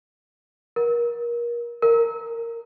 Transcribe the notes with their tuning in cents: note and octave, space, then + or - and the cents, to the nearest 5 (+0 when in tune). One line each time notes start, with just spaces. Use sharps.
A#4 +30
A#4 -15